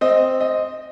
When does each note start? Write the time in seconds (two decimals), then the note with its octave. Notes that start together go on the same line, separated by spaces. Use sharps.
0.01 C4 D#5
0.41 D#5